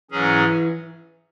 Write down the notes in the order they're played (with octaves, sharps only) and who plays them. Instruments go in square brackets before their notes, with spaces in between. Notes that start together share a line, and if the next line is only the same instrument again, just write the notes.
[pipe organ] G#2 F#3 C#4 G#4 [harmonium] E3